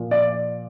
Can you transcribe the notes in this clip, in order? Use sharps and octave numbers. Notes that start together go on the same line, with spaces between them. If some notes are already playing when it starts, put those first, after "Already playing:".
Already playing: A#2 F3
D5